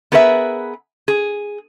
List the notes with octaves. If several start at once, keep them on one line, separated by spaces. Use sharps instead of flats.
B3 G#4 A#4 B4 C#5 E5
G#4